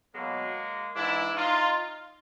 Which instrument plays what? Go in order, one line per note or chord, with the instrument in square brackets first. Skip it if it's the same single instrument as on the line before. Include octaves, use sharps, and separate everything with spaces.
[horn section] B2 F#3 G#3 A#3
G#2 E3 D4 E4
D#4 F4